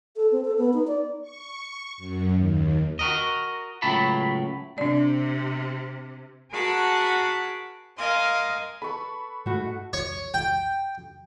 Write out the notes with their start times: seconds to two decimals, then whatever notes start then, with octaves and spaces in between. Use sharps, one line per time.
0.16 A4
0.32 C4
0.45 A4
0.58 B3
0.74 D#4
0.87 D5
1.21 C#6
1.97 F#2
2.35 D#2
2.99 F#4 A#4 D#5
3.82 C#2 A2 F#3 A5 B5
4.78 C3 D4 D5
6.52 F#4 G#4 A#4 F#5 A5 B5
7.98 A#4 D#5 F5 G#5 C6
8.82 A4 B4 A5 B5 C#6
9.46 G#2 A3 F#4
9.93 C#5
10.34 G5